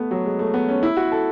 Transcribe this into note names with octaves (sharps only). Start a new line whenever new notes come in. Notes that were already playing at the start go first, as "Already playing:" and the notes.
Already playing: A3 B3
F#3
G#3
A3
B3
C#4
E4
F#4
A4